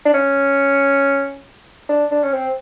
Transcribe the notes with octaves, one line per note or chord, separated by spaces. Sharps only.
D4
C#4
D4
D4
C#4
C4